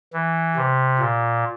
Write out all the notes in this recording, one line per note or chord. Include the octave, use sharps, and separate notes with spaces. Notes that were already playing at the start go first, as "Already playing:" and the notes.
E3
C3
A#2